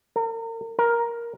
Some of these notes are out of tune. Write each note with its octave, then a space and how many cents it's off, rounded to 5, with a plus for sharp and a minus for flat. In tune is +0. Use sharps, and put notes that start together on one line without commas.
A#4 -35
A#4 +10